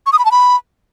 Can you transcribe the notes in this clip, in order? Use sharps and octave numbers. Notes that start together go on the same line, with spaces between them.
C#6
D#6
B5
A5
B5